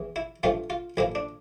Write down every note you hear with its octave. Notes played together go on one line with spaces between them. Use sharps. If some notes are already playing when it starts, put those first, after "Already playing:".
Already playing: E2 E3
E4
A1 G2 F3 A3 F4
F4
A1 A2 F3 A#3 E4
D4